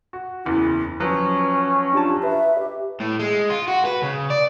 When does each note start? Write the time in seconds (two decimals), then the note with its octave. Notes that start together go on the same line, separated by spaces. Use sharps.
0.13 F#4
0.45 F#1 E2 E4
1.00 F3 F#3 C#4 B4
1.93 D4 F4 G4 A5
2.23 B4 E5
2.59 G4
3.00 A2
3.19 G#3
3.50 F4
3.68 F#4
3.86 B4
4.03 C#3
4.30 D5